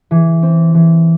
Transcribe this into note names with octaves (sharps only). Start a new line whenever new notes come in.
E3
C4
E3